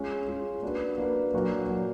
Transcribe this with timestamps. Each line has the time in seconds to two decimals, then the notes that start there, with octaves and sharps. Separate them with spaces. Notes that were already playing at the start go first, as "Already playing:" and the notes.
Already playing: G#3 C#4 F4
0.28 G#3 C#4 F4
0.62 A#3 D4 F#4 B4
0.98 A#3 D4 F#4 B4
1.34 A#2 F#3 A#3 D4 F#4
1.69 A#2 F#3 A#3 D4 F#4